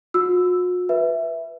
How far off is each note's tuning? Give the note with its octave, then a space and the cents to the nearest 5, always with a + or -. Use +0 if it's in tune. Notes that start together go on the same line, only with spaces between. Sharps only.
F#4 -45 E6 +0
B4 +0 E5 +0